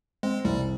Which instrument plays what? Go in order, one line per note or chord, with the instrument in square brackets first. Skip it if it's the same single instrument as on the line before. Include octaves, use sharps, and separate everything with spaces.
[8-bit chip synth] G#3 [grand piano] C4
[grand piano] C2 [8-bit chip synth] G3